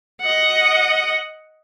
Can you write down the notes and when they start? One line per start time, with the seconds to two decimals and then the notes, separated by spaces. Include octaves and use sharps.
0.21 D#5 F#5